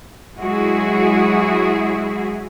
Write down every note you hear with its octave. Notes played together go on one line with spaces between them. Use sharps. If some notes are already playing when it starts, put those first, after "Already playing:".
F#3 G#3 E4 F#4 G#4